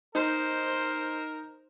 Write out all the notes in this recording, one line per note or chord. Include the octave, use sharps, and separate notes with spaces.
D#4 A#4 C5